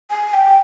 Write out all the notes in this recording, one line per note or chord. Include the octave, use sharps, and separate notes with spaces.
G#5
G5